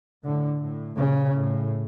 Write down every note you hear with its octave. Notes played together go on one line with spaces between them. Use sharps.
A2 D3
A2
A#2 C#3
A2